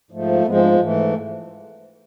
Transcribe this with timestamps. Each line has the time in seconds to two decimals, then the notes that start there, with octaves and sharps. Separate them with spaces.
0.11 G#2 F3 A3
0.45 G#2 F3 G#3 B3
0.54 C4
0.63 D4
0.72 B3
0.80 G#2 E3 A3